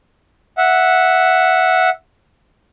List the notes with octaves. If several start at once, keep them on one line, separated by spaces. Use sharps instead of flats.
E5 F#5